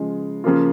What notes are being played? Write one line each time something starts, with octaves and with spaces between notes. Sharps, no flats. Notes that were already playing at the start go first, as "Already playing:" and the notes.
Already playing: C#3 F3 G#3
C#3 F3 A#3 F4